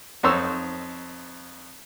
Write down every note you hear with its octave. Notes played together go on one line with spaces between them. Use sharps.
F2 D#4 C5 C#5 E6